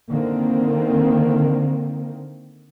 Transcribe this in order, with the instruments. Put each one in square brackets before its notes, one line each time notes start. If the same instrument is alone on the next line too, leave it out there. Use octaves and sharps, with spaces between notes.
[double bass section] D3 D#3 A#3 C4